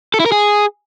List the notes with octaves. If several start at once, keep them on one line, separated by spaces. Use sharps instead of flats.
A4
E4
A#4
G#4